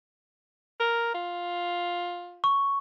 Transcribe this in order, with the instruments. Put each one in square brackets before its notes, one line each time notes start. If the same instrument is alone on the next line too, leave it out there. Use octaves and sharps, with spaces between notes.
[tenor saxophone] A#4
F4
[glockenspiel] C#6